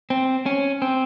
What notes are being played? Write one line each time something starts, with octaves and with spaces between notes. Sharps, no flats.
C4
C#4
C4